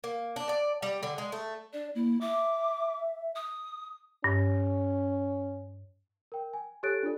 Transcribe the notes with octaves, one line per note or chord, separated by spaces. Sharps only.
A#3
D4
D5
G3
D3
G#3
A3
D4 D5
A#3 E4
E5 D6
D#6
G2 C#4
A#4 G5
G#5
G4 A4 C#5 F#6 A6 D7
D4 F4 A4 D5